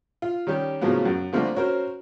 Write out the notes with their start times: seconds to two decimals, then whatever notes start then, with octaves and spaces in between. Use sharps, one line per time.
0.22 F4
0.47 D#3 G3 C#4 G4
0.81 A2 C#3 F3 F#3 A#3 B3
1.05 F#2
1.33 D3 F3 G3 A3 A#3 C4
1.55 C#4 F#4 A#4 C5